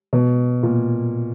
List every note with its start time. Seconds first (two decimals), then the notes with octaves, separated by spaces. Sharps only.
0.13 B2
0.63 A#2